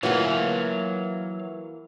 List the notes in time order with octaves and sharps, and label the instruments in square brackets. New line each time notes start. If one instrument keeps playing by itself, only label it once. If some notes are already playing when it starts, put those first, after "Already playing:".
[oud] E3 A#3 [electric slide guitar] F#3 C#5 F5 [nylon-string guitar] F4 F#4